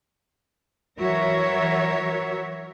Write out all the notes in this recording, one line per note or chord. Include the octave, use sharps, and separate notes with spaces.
E3 F#3 F#4 A#4 C#5 E5